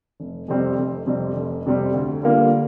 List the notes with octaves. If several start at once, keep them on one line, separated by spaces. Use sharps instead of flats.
F1
F2 C3 G3 C4
F1
F2 C3 G3 C4
F1
F2 C3 G3 C4
D2
D3 G3 A#3 F4